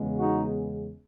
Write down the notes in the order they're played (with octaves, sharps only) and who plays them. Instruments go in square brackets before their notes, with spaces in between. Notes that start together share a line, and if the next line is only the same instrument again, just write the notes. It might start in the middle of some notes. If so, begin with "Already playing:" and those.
Already playing: [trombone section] E2 C#3 G#3 B3
D#4 F#4